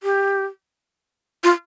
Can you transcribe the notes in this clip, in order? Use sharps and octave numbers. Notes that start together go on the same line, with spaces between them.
G4
F4